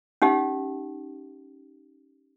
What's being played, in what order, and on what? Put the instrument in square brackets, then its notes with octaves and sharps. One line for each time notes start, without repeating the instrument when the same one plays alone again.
[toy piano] C#4 D#4 G4 F5